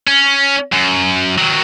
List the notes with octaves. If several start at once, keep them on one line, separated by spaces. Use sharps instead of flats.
C#4
F#2
D#3 F#3